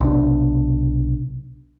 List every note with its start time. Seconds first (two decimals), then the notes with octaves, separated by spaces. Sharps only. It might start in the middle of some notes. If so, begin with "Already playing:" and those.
0.01 B1 C3 D4